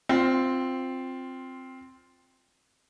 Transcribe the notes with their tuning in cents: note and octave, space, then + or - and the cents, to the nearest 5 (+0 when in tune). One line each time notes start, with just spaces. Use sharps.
C4 +0 F4 +10